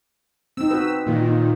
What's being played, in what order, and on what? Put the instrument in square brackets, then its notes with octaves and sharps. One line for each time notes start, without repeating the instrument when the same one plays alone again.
[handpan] C4 D#4 [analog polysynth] E6
[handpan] C4 F#4 B4
[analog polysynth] A#2 D#3
[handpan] D#4